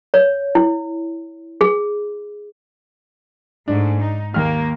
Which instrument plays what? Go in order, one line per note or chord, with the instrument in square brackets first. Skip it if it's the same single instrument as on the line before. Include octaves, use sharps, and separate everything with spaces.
[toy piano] C#5
E4
G#4
[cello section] G#2 A3 [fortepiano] D4
[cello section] D#4
[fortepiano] D#2 F6 [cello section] A#3